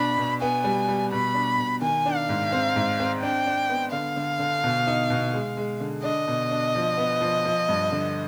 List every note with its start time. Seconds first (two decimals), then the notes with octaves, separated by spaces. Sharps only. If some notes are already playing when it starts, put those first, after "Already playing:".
Already playing: B2 D4 B5
0.18 B2
0.42 B3 G#5
0.64 G3
0.88 G3
1.12 B2 B5
1.34 D4
1.58 B2
1.81 D#3 G#5
2.06 D4
2.17 F5
2.29 G#2
2.52 C4
2.76 G#2
3.00 C4
3.22 D4 G5
3.47 D4
3.70 B3
3.92 D3 F5
4.16 D3
4.39 D3
4.64 B2
4.87 D#4
5.10 B2
5.33 G#3
5.57 G#3
5.80 D3
6.03 D4 D#5
6.28 B2
6.51 D4
6.75 F3
6.97 B3
7.21 F3
7.45 F3
7.69 G2
7.92 D3